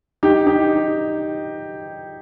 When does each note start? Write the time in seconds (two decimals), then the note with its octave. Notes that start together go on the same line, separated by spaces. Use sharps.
0.23 D#4 G4
0.46 D#4 G4